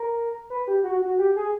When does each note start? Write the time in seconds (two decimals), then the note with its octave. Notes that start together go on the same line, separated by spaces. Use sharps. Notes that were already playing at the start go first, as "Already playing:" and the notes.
Already playing: A#4
0.50 B4
0.67 G4
0.84 F#4
1.02 F#4
1.19 G4
1.36 G#4